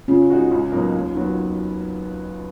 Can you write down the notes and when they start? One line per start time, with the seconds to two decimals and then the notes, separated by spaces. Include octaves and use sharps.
0.08 C#3 C#4 F4
0.30 G#3 D#4 F#4
0.51 C#2
0.72 B2 F#3 A#3 D#4
0.93 D#2
1.14 D#3 F#3 B3